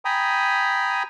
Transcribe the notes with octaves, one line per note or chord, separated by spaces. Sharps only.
G5 G#5 A#5 B5 D#6